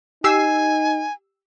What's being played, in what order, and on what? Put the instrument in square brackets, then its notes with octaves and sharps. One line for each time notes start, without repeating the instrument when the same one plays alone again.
[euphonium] D#4 [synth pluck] G4 E6 C7 [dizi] G#5